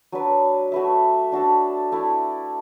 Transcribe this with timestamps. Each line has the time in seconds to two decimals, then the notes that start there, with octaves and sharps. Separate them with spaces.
0.12 F#3 D4 B4 D5
0.72 A3 F#4 B4 E5
1.32 D4 F#4 A4
1.92 A3 E4 D5